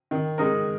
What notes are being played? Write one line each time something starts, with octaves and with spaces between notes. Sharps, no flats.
D#3
G#3 D#4 A#4